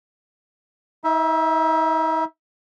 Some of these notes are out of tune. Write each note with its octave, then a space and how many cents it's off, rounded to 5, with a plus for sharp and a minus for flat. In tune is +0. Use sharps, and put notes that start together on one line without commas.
D#4 +40 E5 +0